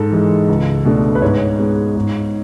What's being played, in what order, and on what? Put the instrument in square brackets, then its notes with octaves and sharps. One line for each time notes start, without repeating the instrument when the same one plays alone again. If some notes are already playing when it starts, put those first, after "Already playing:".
Already playing: [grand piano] G#2 A4
E3 G#3
C#2
B2 A3 D4
B4
G#2 C#5
G#3 B3
G#2